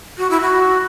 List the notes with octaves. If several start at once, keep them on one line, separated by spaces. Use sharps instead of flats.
F#4
E4
F#4